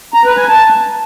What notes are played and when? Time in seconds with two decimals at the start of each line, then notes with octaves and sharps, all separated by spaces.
0.14 A#5
0.25 B4
0.37 G#5
0.48 A5